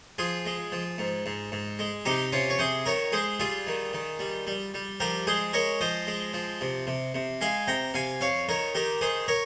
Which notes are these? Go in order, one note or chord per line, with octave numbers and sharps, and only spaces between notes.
F3 F4 G#4
G#3
F3
G#2
G#2
G#2
G#3
C3 D#4 G4
C3 C#4 F4
C#5
C3 G#4 C5
D#3 A#4 C#5
G#3 G#4 C5
G3 F4 G#4
D#3
D#3
G3
G3
G3
F3 G4 A#4
G#3 G#4 C5
G#3 A#4 C#5
F3 C5 D#5
G#3
F3
C3
C3
C3
G#3 F5 G#5
C3 G5 A#5
C3 F5 G#5
F2 C#5 F5
D#3 A#4 C#5
D#3 G4 A#4
D#3 G#4 C5
A#4 C#5